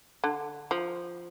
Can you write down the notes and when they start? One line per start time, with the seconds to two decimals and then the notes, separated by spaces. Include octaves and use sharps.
0.24 D3
0.71 F3